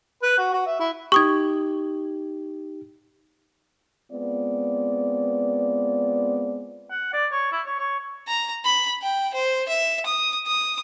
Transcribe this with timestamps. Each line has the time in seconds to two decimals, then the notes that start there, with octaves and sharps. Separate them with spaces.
0.23 B4
0.38 F#4
0.53 F#4
0.66 E5
0.80 E4
1.12 D#4 G4 C#6 D#6 G#6
4.12 G#3 B3 C4 F4 D5
6.90 F#5
7.13 D5
7.32 C#5
7.52 E4
7.66 C#5
7.79 C#5
8.28 A#5
8.65 B5
9.02 G5
9.34 C5
9.68 E5
10.06 D#6
10.47 D#6